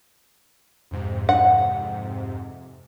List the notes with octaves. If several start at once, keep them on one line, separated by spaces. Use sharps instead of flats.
F2 G#2 C3
F#5